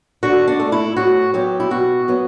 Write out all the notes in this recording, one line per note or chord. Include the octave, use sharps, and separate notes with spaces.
D3 F#4
D4
A3
E4
A2 F#4
F#3 B3 G4
E4
B2 F#4
F#3 B3